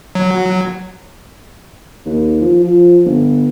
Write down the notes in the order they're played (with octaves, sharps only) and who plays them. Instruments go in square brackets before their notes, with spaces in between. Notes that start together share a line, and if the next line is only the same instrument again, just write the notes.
[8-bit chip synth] F#3
[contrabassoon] D#2
F3
F3
G1